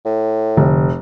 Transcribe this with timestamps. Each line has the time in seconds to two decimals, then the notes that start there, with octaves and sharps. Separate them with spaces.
0.05 A2
0.57 F1 D3